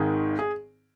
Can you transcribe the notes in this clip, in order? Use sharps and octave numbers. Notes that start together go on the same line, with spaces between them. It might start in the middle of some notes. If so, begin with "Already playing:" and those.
Already playing: G#1 G#2 D#3 G#4
G#4